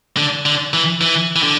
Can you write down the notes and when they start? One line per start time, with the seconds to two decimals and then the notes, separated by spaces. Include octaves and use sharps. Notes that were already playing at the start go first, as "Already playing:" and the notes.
0.17 D3
0.45 D3
0.73 E3
1.01 E3
1.36 E3
1.43 D3